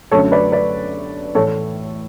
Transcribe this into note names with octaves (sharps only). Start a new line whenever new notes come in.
F#2 D3 F#3 A3 A4 C#5
B4 D5
B4 D5
A2 E3 A3 A4 C#5